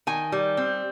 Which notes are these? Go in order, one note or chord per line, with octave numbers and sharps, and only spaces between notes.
D#3 G#5
G3
C4